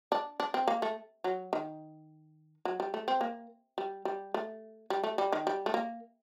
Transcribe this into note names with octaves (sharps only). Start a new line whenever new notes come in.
D4
D4
C4
A#3
A3
F#3
D#3
F#3
G3
A3
C4
A#3
G3
G3
A3
G3
A3
G3
D#3
G3
A3
A#3